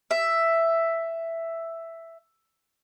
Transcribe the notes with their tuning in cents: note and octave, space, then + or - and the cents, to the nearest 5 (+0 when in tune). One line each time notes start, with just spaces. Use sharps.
E5 +5